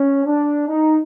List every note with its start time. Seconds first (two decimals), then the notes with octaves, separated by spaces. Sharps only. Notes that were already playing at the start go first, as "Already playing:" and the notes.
Already playing: C#4
0.25 D4
0.68 D#4